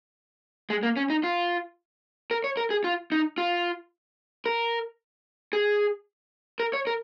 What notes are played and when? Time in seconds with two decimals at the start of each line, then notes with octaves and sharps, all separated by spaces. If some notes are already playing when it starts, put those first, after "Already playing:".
0.70 G#3
0.83 A#3
0.97 C#4
1.10 D#4
1.23 F4
2.31 A#4
2.44 C#5
2.57 A#4
2.70 G#4
2.84 F4
3.12 D#4
3.38 F4
4.46 A#4
5.53 G#4
6.60 A#4
6.73 C#5
6.87 A#4